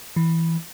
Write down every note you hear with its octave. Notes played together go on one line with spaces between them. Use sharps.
E3